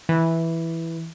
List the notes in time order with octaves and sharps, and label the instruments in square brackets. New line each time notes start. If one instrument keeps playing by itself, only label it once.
[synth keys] E3